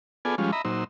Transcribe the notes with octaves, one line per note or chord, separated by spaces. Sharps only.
B3 F4 G#4 A4 D5 G#5
F3 G3 G#3 C#4 F4
D#5 E5 A#5 B5
A#2 F#3 D#4 C5 E6